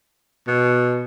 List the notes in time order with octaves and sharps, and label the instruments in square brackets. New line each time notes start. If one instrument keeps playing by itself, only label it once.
[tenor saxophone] B2